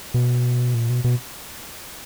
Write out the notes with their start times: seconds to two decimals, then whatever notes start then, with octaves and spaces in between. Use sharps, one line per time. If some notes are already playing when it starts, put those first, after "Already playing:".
0.14 B2
0.75 A#2
0.90 B2
1.04 B2